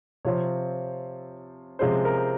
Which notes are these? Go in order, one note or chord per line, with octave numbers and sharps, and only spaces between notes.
C3 F3 C4 F4 C#5
C3 F3 G#3 C#4 C5
A#4